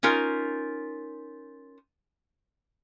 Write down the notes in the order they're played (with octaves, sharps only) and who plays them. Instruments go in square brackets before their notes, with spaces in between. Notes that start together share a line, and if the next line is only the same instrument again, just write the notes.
[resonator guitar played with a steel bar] C#4 D#4 F4 A#4